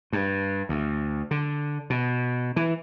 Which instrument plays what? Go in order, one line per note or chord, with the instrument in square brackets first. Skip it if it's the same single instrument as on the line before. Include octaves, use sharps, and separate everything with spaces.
[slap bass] G2
D2
D3
B2
E3